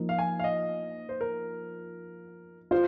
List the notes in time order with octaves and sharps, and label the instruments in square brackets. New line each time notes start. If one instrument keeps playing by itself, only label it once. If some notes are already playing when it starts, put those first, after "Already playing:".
Already playing: [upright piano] F3 A#3 D#4
[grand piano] F5
G#5
F5
D#5
C5
A#4
[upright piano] F4 [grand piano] C5